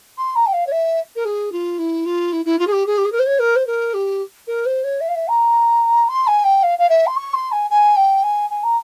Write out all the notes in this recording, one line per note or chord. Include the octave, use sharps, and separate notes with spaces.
C6
A#5
G5
F5
C#5
E5
A#4
G#4
F4
E4
F4
E4
E4
F4
G#4
G4
G#4
G4
G#4
A#4
C5
C#5
A#4
C5
A#4
G4
A#4
C5
C#5
E5
F5
E5
A#5
C6
G#5
G5
F5
F5
E5
C6
C#6
C6
G#5
G#5
G5
G#5
G#5
A#5